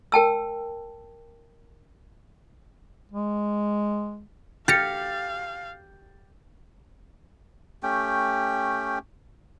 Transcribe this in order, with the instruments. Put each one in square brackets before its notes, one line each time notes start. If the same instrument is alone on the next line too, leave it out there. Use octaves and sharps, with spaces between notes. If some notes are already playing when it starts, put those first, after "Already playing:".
[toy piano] A#4 G5 A5 E6
[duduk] G#3
[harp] G4 [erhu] F5 [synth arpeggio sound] F6 A#6 C#7 [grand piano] A6
[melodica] A3 C#4 G4 G5